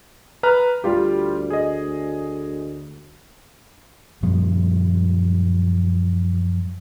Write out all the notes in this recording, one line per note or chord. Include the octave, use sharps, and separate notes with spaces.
B4 A#5 F6
D2 G3 F4 G4
G#4 D#5
F#2 A#2 F3 G3